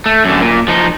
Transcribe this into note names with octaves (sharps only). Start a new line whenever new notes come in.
A3
F#2 D3
A#2
F3 D#4